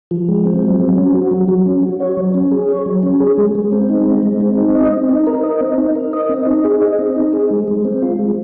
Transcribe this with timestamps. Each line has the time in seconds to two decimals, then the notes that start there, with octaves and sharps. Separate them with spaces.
0.11 F3
0.29 G#3
0.45 C4
0.62 F#3
0.80 F#3
0.97 C#4
1.14 F#4
1.31 F#3
1.48 F#3
1.66 C#4
1.83 F#4
2.00 C#5
2.17 F#3
2.34 C#4
2.51 G#4
2.69 C#5
2.86 F#3
3.03 C#4
3.20 G#4
3.38 G#3
3.55 G#3
3.72 C4
3.89 D#4
4.06 G#3
4.23 G#3
4.41 C4
4.58 D#4
4.75 D#5
4.92 C4
5.09 D#4
5.27 A#4
5.44 D#5
5.61 C4
5.78 D#4
5.96 A#4
6.13 D#5
6.29 C4
6.47 D#4
6.64 G#4
6.81 D#5
6.99 C4
7.16 D#4
7.33 G#4
7.51 G#3
7.68 G#3
7.85 C4
8.02 F4
8.19 G#3